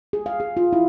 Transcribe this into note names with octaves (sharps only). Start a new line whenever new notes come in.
G#4
F5
G#4
F4
E4